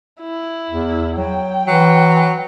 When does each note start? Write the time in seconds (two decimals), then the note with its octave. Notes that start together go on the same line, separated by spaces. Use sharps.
0.21 E4
0.70 E2
1.18 F#3 G5
1.68 E3 F#3